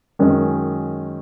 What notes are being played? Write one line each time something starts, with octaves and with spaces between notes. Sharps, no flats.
F#2 D#3 G#3 C#4